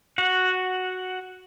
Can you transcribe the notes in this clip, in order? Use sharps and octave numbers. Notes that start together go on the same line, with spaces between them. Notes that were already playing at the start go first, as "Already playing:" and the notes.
F#4 F#5